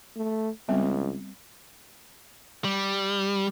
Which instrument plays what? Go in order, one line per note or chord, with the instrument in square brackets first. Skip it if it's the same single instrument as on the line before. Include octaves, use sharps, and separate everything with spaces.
[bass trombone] A3
[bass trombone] C#2 [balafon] G3 B3 C4
[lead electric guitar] G3